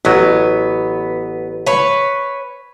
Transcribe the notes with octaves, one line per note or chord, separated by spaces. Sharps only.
A1 F#3 B3
B4 C#5